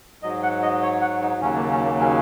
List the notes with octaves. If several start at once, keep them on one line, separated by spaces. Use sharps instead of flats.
G#2 F#3 D#5
F#5
D#5
C#5
F#5
D#4
D#2 C#3 F#3 C#4
A#3
C#4
A#3
C#4